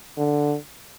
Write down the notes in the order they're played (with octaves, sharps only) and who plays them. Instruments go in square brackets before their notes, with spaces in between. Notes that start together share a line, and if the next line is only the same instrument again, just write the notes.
[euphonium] D3